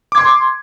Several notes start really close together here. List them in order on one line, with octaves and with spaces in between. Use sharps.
D6 G#6 C6